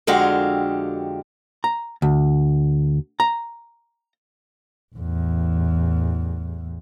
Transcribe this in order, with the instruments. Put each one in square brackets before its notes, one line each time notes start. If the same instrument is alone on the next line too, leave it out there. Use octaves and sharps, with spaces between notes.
[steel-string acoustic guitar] F2 D3 G#3 F#4 G4 F5
[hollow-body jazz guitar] A#5
D2
A#5
[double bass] A1 E2